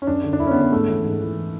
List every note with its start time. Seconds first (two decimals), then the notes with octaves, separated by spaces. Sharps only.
0.02 C#4
0.07 F#2 D4
0.24 D3
0.33 D4
0.40 F#2 E4
0.47 C#4
0.51 B3
0.56 D3
0.61 B3
0.72 G#2 A3
0.88 E3
1.04 G#2
1.21 E3